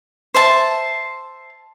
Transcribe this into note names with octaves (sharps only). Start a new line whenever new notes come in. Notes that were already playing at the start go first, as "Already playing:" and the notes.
C5 E5 A5